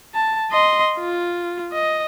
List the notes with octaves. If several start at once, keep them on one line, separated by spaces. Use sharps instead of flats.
A5
D#5 C6
F4
D#5